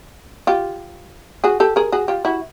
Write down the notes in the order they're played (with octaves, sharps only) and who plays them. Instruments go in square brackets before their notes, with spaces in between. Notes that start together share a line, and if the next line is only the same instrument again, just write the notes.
[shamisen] F4 G4
F#4 G#4
G4 A4
G#4 A#4
F#4 G#4
F4 G4
E4 F#4